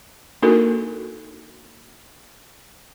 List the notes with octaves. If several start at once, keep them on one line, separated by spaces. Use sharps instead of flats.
A#3 D4 D#4 F#4 A4 A#4